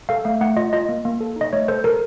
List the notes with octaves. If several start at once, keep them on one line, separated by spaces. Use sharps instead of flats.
A4 F5
A3 F5
A3 F#5
F4 D#5
F4 D#5
A#3
A#3
A4
D#4 D#5
A3 C#5
A4 C5
A4 A#4